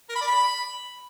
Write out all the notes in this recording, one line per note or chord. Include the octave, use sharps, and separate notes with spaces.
A#4
B5
D5
B5